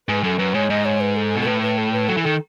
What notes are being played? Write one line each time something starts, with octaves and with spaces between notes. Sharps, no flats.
G#2 B4
F#2 A4
F#2 B4
G#2 C#5
G#2 D#5
C#5
B4
A4
B2
A4
A2 B4
B4
A4
B4
F#3 A4
E3
D#3 A4